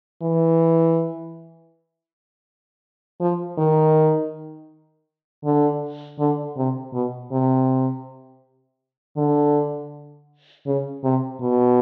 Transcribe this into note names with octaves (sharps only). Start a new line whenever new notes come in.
E3
F3
D#3
D3
D3
C3
B2
C3
D3
C#3
C3
B2